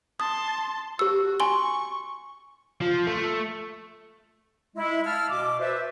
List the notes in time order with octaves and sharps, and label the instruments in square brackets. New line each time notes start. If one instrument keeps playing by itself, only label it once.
[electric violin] A5 C6 [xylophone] D#6
[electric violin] F#4 [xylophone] G4 E6
[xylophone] G#5 C6 G7 [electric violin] C#6
[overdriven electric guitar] F3
A3
[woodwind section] G#3 E4
F5 G#5 A5 E6 F6
B2 D6
B4 C5 D5 E5